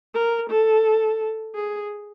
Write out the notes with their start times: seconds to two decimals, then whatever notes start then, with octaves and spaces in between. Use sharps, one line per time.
0.14 A#4
0.49 A4
1.55 G#4